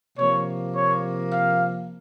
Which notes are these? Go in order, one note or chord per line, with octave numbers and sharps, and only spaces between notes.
C3 F3 A#3 C#5
C#5
F5